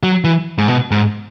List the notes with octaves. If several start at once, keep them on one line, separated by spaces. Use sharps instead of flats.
F#3
E3
G#2
B2
G#2